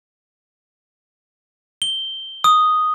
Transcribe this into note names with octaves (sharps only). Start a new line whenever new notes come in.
G7
D#6